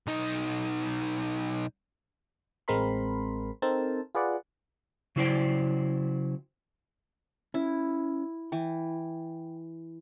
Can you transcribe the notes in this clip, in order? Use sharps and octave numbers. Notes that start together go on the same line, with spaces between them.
B1 D#4
A1 G#3 C4 A#4 B5 C6
C4 D#4 A4 A#4 C5 A5
F4 G#4 B4 D5 F#5
C#3 F#3 E4 C5 D5 G5
C#4 E4
E3 G5